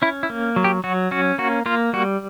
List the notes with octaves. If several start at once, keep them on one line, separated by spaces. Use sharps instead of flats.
C#4 E4
E4
A#3
F#3
G4
F#3 F#4
C#4 F#4
A#3 F#4
A#3 F4
G3 F#4